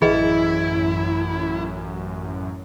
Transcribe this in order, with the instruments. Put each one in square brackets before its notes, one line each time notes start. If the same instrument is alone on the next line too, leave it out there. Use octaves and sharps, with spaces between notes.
[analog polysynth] A1 F#2 [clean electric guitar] E3 [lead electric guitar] E4 [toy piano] G#4 B4 D#5